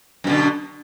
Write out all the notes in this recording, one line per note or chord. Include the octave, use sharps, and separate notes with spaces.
F#2 B2 D3